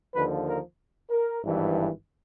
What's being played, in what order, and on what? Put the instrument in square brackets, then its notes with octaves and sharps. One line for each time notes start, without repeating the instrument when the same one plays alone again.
[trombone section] D#2 D3 F3 B4
A#4
A#4
G#1 G2 E3